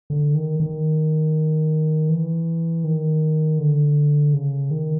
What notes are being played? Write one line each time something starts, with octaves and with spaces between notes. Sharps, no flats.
D3
D#3
D#3
E3
D#3
D3
C#3
D#3